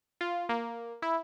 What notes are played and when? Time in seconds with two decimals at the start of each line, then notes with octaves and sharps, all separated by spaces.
0.21 F4
0.49 A#3
1.02 E4